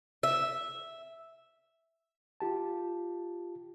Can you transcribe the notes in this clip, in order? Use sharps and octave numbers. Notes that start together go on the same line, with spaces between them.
E5
F4 G4 A5